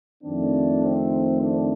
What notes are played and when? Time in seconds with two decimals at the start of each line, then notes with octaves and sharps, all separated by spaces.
0.23 F2 D#3 A3 C4 D4
0.82 C4
1.40 D4